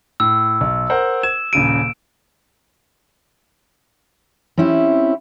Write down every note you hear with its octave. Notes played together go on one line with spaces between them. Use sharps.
A2 E6
B1
A#4 C5 F#5
G#6 E7
D#1 C#3 D7 D#7
C4 C#4 E4 G4